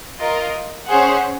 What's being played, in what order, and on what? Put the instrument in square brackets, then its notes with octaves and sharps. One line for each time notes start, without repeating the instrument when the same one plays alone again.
[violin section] F4 A#4 D#5
C#4 G#4 C5 F#5